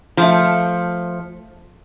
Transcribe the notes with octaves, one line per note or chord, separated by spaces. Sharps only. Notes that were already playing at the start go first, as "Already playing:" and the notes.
F3 A3